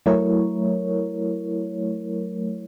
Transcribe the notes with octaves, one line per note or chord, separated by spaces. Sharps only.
F#3 A3 E4 A#4 C#5